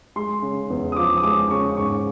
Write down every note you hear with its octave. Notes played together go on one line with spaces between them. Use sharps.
G#3 C6
C#3
E2
D#6
F3 D6
D#6
G#3 D6
C#3 C#6
G#2 C#6